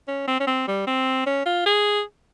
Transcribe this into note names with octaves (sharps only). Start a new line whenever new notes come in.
C#4
C4
C#4
C4
G3
C4
C#4
F4
G#4